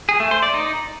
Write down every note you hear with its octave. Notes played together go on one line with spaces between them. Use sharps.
G#4
A3
C5
D5
D#4